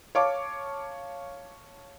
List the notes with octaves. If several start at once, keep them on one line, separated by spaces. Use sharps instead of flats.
C#5 F5 A5 D6